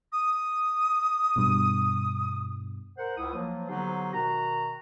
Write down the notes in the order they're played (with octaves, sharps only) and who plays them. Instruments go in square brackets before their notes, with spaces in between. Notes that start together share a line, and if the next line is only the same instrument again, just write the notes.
[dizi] D#6
[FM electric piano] G2 B2
[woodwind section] A#4 C5 F#5
C#2 E4 D#6
F3 F#3 A#3
D3 F#3 B3 D#4 G4 C5
B2 D#3 F#4 A#5